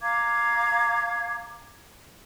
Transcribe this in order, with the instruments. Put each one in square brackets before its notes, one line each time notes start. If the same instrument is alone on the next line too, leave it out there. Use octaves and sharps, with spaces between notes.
[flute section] F5 A#5 D6 G#6